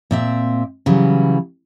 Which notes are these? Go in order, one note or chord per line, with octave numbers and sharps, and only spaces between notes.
A#2 C4 E5
C#3 E3 F#3 G3